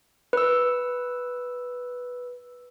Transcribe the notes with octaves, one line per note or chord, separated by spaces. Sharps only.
B4 E6